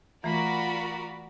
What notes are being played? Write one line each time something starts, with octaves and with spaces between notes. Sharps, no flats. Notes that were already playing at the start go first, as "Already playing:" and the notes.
E3 A3 F4 F#4 A#4 D5 A#5 B5